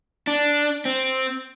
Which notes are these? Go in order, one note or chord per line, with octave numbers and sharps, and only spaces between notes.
D4
C4